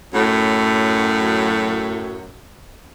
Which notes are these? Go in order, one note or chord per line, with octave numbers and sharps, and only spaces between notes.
F#2 A2 F#3